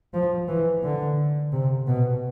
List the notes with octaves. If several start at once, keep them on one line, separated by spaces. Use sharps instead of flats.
F3
E3
D3
C3
B2